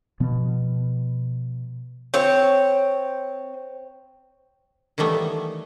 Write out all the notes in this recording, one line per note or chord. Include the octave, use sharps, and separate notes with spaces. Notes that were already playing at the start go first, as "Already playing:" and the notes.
B2 F3 B3
C4 C#5
D#3 E3 G3 A3 B3